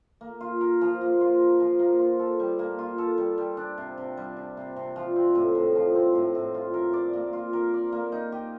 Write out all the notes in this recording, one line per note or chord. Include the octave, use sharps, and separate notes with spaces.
A#3
F4
A#4
F3
A#3
F4
A#4
F3
A#3
F4
A4
G3
A#3
F4
A4
G3
G3
D4
C3
C3
G3
D4
C3
C3
F3
C4
A2
A2
F3
C4
A2
A2
F4
A#4
D5
A#3
F4
A#4
D5
A#3
D#4
G4